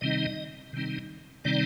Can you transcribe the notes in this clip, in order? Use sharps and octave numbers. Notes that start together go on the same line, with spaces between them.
C3 D#3 G3 C4 D#4 D#5
C3 D#3 G3 C4 D#4
C3 D#3 G3 C4 D#4 D5